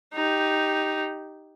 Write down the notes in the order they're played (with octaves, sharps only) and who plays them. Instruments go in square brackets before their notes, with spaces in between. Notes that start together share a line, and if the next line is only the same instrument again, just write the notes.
[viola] D#4 G4